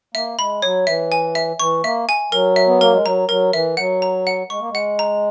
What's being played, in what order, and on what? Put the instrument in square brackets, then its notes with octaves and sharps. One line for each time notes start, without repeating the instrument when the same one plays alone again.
[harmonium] A#3 [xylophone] E5
[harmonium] G#3 [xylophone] B5
[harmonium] F#3 [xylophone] C#5
[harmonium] E3 [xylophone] E5
[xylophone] G#5
E5
[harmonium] E3 [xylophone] C#6
[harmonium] A#3 [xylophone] E5
[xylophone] G#5
[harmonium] F#3 [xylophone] A#4
[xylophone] E5
[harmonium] B3
[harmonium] A#3 [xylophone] A#4
[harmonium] G#3
[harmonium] F#3 [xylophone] A#5
[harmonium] F#3 [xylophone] A#4
[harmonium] E3 [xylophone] E5
[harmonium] F#3 [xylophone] F#5
[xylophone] A#5
F#5
[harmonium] G#3 [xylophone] C#6
[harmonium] A#3
G#3
[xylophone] F#5
A#5